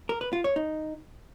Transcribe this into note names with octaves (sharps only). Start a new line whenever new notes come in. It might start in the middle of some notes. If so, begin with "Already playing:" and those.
A#4
B4
F4
C#5
D#4